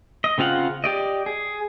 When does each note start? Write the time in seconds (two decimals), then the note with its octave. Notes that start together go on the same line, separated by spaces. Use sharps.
0.24 D#5
0.38 C#3 C4 F4 F5 F#5
0.84 G4 D5 D#5
1.26 G#4